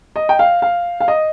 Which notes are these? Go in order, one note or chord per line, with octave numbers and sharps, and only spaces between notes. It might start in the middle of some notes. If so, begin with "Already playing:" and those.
D#5
G5
F5
F5
F5
D#5